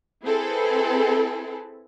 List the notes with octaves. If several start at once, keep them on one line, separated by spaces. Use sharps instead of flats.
C4 E4 G#4 A4 B4